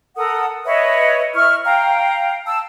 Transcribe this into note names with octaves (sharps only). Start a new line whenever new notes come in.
A4 A#4 F#5 D#6
B4 C#5 D#5 E5
E4 C#6 F6
F5 G5 A#5
A5 E6